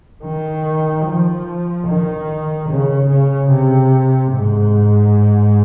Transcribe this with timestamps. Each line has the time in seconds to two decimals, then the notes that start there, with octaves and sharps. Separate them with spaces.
0.24 D#3
1.06 F3
1.88 D#3
2.69 C#3
3.09 C#3
3.51 C3
4.33 G#2